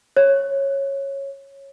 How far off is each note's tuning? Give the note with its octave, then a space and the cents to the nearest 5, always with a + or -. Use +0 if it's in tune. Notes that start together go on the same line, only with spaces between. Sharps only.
C#5 -10